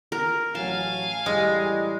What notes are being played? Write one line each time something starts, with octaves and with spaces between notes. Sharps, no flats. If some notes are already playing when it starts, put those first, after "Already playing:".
A#4
A1 F#3 F5 G#5 A5
A2 E3 G3 G#3